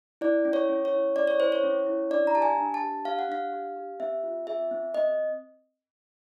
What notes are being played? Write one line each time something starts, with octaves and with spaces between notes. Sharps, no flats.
E4 D5
C#4
C#5
C#4
C#5
E4
C#4 D5
C#5
E4 C5
C#5
C#4
E4
D4 D5
A#5
G4 A5
G#5
D4
A5
G4
G4 F5
F#5
D4 F5
G4
G4
C4 E5
F4
G#4 E5
C4
C4 D#5